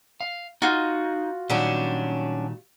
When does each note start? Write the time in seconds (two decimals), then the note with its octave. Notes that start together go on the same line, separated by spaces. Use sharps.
0.21 F5
0.62 D#4 F4 F#4
1.50 A#2 D#3 F#3 G3 C#4 D4